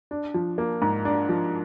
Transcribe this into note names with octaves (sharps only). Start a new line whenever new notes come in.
D4
F3
A#3
G#2
D4
F3